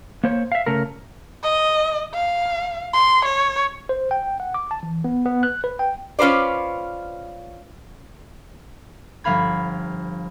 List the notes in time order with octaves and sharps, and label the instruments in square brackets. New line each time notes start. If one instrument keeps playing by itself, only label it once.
[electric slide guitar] A#3 C5 C#5
E5 F5
C#3 A3 A#4
[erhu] D#5
F5
C6
C#5
[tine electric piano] C5
G5
F#5
D6
A5
E3
B3
B3
F#6
B4
G5
[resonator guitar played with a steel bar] C#4 F4 B4 C5 D5
[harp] G1 F3 F5 B5 G#6